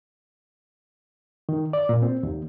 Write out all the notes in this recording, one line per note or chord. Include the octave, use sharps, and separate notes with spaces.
D#3
D5
A#2
C4
D#2